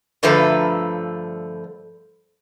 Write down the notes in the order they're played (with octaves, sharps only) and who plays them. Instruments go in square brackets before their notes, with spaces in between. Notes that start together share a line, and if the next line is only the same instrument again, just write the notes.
[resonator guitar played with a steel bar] G2 D3 F3 A3 B4 A#5